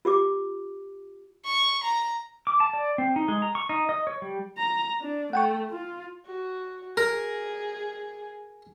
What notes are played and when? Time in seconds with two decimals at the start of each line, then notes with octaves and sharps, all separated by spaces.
0.05 F4 G4 D6
1.46 C#6
1.84 A#5
2.47 D6
2.60 A5
2.73 D5
2.98 C4
3.16 D#4
3.28 G#3
3.42 A#5
3.55 C#6
3.69 D#4
3.89 D#5
4.07 C#5
4.22 G3
4.57 A#5
5.00 D4
5.33 A3 F#5 G5 C#6
5.70 F4
6.26 F#4
6.97 G#4 A#4